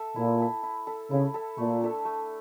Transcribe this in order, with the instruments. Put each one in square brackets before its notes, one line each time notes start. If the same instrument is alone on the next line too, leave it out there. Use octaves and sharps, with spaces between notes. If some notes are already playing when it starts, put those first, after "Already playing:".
Already playing: [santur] A4 E5
[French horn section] A#2 [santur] E4
[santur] A4 E5
E4
A4 E5
[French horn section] C#3 [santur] E4
[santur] A4 E5
[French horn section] A#2 [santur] A3
[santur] D4 A4 E5
A3